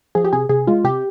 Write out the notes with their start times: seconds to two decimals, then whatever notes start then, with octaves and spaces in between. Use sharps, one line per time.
0.15 F3 G#4
0.24 G4
0.33 C3 G#4
0.49 C3 G#4
0.67 G#3 F4
0.84 C3 G4